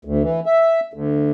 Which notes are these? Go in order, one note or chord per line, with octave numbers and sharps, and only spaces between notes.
D2
E3
E5
D2